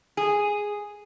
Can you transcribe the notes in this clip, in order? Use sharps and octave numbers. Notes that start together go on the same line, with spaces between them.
G#4